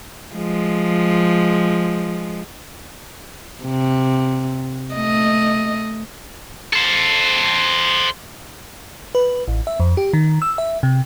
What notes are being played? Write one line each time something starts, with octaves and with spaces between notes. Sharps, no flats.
F3 G#3
C3
A3 D#5
A4 C5
B4
A1
E5
F2
G4
D#3
E6
E5
C3